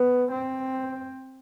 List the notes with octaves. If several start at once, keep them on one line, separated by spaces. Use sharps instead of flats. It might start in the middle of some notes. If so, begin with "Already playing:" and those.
Already playing: B3
C4